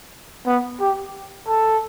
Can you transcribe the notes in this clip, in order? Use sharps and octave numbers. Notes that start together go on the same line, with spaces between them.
B3
G4
A4